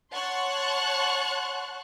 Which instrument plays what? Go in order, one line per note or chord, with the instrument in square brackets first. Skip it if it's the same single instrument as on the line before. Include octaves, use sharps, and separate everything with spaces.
[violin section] C#5 F#5 A5 C6 C#6 F#6